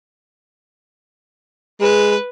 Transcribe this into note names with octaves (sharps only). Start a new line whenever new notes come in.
G#3 B4